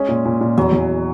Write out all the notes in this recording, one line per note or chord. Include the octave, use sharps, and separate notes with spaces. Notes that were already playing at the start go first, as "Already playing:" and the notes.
Already playing: G#3 C#4
A#2
A#2
A#2
E2 F#3
E2